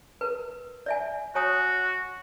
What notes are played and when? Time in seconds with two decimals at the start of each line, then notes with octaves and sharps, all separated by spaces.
0.21 A#4 B4
0.86 D5 E5 G#5
1.35 F#4 C#5 G#5 D#6